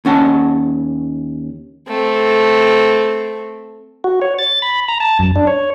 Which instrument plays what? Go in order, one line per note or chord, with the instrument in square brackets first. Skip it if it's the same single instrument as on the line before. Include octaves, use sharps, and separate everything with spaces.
[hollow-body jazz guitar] D#2 C#4 F#5 A5
[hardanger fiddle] A3 C4
[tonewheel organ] F#4
C#5
A6
B5
A#5
A5
F#2
D4
C#5